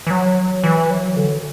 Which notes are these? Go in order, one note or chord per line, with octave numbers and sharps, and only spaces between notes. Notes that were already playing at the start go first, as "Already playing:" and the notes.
E3
F#3
E3
F#3
D3